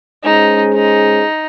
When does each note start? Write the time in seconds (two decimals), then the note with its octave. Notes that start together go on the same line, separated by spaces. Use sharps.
0.24 G#3 C#4 D#4 G#4 C5
0.74 D#4